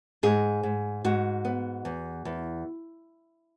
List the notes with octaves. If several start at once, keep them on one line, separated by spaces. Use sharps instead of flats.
G#2 G#4
G#2
G#2 F#4
B3
E2
E2